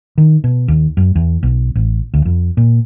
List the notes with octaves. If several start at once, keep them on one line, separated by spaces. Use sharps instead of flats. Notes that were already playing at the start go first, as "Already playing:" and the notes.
D#3
B2
D#2
F#2
E2
B1
A1
D2
F2
A#2